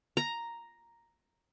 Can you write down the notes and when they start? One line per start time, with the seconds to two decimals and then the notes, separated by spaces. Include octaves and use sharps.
0.17 A#5